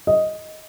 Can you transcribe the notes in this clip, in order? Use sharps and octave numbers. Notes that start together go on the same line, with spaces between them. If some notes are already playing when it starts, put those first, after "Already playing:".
D#5